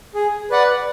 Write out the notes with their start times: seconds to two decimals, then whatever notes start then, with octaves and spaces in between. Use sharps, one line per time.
0.14 G#4
0.50 B4 D5 F#5